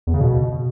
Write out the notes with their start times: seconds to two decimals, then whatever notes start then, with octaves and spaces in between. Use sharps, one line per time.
0.07 E2
0.14 C#3
0.21 B2